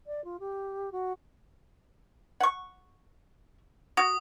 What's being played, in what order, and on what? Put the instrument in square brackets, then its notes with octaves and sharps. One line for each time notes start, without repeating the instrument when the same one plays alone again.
[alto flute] D5
F4
G4
F#4
[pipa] F#5 C#6
[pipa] F#4 [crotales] D#6